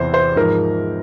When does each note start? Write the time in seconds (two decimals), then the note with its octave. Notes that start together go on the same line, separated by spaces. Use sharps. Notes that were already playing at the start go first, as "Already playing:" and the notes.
Already playing: E2 C3 E3 C5
0.14 C5
0.36 G#2 F3 A#4